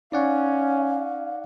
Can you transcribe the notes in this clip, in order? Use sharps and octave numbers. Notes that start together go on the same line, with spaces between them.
C#4 D#4 D5 F5 F#5